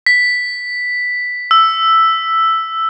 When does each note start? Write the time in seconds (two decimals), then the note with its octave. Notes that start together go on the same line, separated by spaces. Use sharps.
0.06 B6
1.51 E6